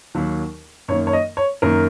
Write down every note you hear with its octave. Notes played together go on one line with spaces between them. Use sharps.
D#2 D#3 F#3
F#2 D#3 A#3 C#5
C#5
D#5
C#5
F#2 D#3 A#3 A#4